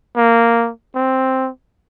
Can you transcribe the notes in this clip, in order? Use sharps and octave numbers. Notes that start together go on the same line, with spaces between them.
A#3
C4